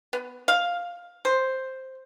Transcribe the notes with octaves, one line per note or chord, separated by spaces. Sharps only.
B3
F5
C5